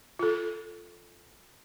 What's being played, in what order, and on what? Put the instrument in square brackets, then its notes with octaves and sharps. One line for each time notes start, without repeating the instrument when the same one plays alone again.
[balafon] F4 A4